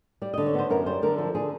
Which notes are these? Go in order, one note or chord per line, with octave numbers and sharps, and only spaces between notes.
G3 D5
D3 D#5
C#5
B3 C5
F#2 A#4
G3 C5
D3 A#4
F3 A4
D3 G#4